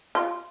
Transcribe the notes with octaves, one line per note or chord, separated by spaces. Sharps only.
F4